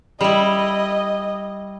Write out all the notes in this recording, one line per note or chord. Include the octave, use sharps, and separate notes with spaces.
G3 E4 D#5